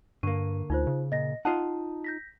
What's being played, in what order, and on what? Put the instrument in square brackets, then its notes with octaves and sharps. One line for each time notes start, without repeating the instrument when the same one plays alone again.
[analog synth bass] G2 [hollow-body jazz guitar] D3 A#3 [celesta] C#6 D#7
[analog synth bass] D2 [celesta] D#4 F4 C5
[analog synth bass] C#3
[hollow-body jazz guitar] A#2 [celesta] D#5 A#6
[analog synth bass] D#4 [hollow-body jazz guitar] F4 D#5 F#5 [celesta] A5
[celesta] G6 A#6 B6